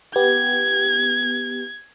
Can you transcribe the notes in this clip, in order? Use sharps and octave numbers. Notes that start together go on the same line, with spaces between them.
B3 G4 G#6